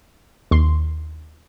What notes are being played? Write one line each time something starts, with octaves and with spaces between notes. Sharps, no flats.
D#2 C6